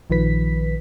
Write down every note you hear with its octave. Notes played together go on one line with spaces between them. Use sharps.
A#1 D#3 F3 B4 B6